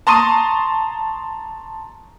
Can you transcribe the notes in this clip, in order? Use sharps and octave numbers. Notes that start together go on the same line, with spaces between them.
A5 A#5 C6 C#6 D#6 D#7